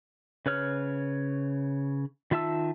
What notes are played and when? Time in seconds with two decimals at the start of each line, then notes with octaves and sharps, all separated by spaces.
0.46 C#3 B4 C#5 F6
2.31 D#3 F4 E5 A5 E6